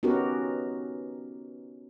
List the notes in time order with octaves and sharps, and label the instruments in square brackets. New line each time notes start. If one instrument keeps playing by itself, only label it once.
[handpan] B3 C#4 D#4 F#4 G4 A#4